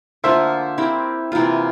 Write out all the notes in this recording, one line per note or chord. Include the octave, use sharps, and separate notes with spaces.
D3 F3 A#3 F4 C5 E5
C4 E4 G4 A#4
C3 E3 A#3 F4